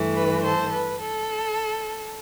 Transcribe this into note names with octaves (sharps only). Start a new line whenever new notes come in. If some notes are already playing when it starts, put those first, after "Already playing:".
Already playing: G2 E3 A3
B4
A4 C5
B4
A4